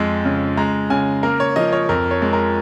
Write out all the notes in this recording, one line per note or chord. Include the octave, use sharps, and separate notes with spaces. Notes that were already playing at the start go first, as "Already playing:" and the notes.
Already playing: F2 G#3
C#3
G#3 A#5
C#3 G#5
A#3 A#4
C#5
F3 D#5
C#5
F2 A#4
C#5
G#3
A#4